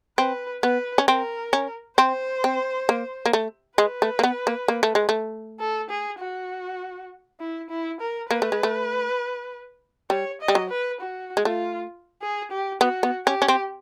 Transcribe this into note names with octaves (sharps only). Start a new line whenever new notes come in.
C4 B4
B3 B4
C#4
C4 A#4
C#4
C4 C5
C4
A#3
A#3
A3
G#3 B4
A3
A#3
B3
A#3
A#3
A3
G#3
A3
A4
G#4
F#4
E4
E4
A#4
A#3 B4
A3
G#3
A3
G3 C#5
D#5
G3
F#3
B4
F#4
G#3
A3 F4
G#4
G4
B3 F#4
B3
C#4 G4
C#4
C4